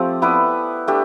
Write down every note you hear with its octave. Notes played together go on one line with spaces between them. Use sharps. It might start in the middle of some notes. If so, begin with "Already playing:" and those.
Already playing: F3 A3 C4 G4
B3 E4 B4 D5
A3 D4 G4